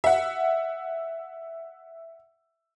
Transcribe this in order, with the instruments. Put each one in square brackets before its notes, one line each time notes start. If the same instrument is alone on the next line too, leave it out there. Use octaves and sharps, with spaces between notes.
[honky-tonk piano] E5 F#5